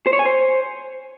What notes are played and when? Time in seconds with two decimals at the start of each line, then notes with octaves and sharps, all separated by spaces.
0.07 C5
0.13 C#5
0.19 G#5
0.25 C5